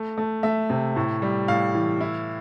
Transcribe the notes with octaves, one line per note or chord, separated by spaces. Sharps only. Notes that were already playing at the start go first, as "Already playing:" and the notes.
Already playing: A3
A3
A3 E5
C3
A2
G3
A2 F5
E3
E4